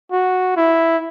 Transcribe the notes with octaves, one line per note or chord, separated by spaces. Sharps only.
F#4
E4